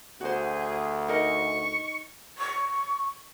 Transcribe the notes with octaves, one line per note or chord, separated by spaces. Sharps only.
D2 F#4 G#4 C5
D#4 A#4 D#5 C#6
C#6